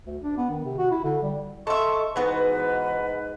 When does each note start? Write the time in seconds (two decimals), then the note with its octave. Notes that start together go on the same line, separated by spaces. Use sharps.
0.06 D2
0.22 D4
0.37 B3
0.50 D#3
0.64 C3
0.78 F#4
0.91 E4
1.04 D3
1.23 G3
1.67 A4 D#5 E5 C6 C#6
2.16 G#2 E3 B3 F#4 B4